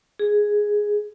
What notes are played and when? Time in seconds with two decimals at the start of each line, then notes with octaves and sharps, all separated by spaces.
0.19 G#4